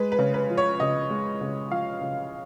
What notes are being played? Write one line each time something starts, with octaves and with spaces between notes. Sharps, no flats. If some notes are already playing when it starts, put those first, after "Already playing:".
Already playing: G#3 B4
B4
C#3
B4
F3
C#5
C#3 D#5
G#3
C#3
F3 F5
C#3